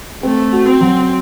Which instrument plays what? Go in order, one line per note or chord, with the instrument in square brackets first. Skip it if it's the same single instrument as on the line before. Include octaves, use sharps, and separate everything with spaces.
[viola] A3 [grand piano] C4
[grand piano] F#4
[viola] C4
[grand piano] F#3